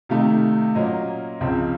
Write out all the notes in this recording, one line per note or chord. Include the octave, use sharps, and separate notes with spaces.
C3 D#3 A3 D#4 F5
A#2 F#3 A#3 C#4 D#5
C#2 C#3 F3 C4